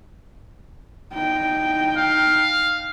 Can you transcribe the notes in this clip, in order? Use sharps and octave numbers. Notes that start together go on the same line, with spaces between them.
D#4 G5
F5